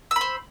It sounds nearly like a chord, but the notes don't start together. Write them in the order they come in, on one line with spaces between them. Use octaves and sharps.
E6 B5 C5